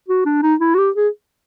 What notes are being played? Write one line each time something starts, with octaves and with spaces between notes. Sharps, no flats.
F#4
D4
D#4
E4
F#4
G4
G#4